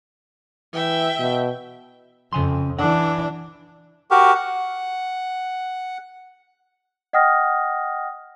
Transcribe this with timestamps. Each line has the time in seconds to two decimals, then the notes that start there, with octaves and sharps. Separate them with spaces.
0.74 E3 E5 G5
1.19 B2
2.33 F2 C#3 G#5 C6
2.78 E3 D4 F#5
4.11 F#4 G4 A#4
4.35 F#5
7.13 D#5 F#5 G5 D#6 F6 A#6